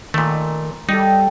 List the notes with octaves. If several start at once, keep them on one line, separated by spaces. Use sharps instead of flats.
A#2 D#3 A3
G3 D#4 A4 G5